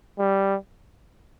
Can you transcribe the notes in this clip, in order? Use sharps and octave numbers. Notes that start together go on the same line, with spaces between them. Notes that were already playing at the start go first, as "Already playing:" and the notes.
G3